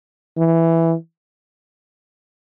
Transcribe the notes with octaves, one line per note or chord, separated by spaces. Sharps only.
E3